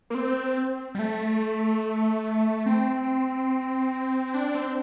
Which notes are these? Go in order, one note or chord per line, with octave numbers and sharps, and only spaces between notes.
A#3
C4
G3
A3
C4
D4
C4